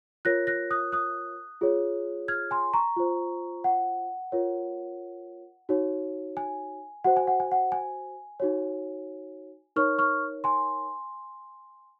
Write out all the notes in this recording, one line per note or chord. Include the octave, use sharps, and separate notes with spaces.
F4 A#4 C#5 F#6 A#6
F#6 A#6
D#6 F#6
D#6 F#6
F4 G#4 C#5
F6 G#6
G#5 C6
A#5 C#6
F4 C5
F#5
F4 A#4 C#5
D#4 F#4 C#5
G#5
F#4 C5 F#5
G#5
F#5
G#5
F#5
G#5
D#4 F#4 C#5
D#4 A#4 C#5 C#6 F6
C#6 F6
G#5 C6